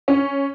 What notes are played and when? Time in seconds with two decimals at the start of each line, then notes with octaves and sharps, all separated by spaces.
0.08 C#4